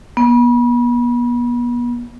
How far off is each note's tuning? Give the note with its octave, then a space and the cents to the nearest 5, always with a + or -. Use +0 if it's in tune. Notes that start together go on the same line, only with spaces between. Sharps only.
B3 -35